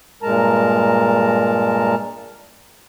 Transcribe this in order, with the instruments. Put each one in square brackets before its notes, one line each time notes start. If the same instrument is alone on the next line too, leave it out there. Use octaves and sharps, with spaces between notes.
[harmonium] G2 A#2 G#3 A#4 A5 A#5